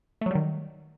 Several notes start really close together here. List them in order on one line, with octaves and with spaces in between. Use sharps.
A3 F#3 G3 D#3